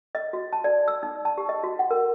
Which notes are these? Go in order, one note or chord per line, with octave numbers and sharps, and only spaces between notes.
D#5
F#4
A5
D5
E6
D#4
A5
G4
D#5
F#4
F#5
A#4